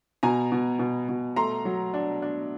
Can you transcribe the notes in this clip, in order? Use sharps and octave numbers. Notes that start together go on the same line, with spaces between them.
B2 G#5 A#5
B2
B2
B2
A3 A#5 C6
F#3
D4
D4